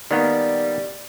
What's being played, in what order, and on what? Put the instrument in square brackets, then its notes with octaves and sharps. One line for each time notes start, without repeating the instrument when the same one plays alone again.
[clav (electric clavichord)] D#3 A#3 B3 [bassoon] G3